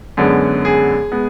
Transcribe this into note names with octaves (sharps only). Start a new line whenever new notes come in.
F#2 D3 G#3 B3
G#4
G#3 B3